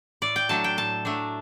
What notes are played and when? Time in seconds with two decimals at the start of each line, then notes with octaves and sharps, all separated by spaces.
0.22 A2 D5
0.36 G5
0.49 F#3 A3 D4 A5
0.64 G5
0.77 A2 A5
1.05 F#3 A3 D4